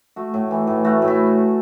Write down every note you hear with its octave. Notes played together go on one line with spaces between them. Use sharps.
A3 F#4
A2
E3
A2
A3 F#4
A2
E4